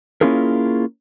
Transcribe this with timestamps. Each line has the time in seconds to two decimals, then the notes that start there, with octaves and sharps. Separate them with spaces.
0.21 A#3 C#4 E4 F4 G#4 A#4